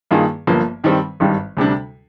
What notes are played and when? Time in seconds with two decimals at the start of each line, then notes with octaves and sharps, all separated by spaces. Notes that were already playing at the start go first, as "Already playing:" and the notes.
0.11 G2 D#3 A#3 F4 G#4
0.47 G1 G2 F3 A#3
0.84 G2 D#3 G3 C4
1.20 G#1 G2 D#3 G3
1.57 D2 C3 G3 D4